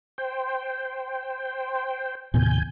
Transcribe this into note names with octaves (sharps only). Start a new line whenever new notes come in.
C5 G5
D#2 A2 C3 B3 G#5 G6